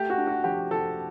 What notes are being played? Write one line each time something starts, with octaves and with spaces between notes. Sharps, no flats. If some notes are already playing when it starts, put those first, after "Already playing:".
Already playing: A3 G4
F#4
D4
F#4
F3 G4
F3 A4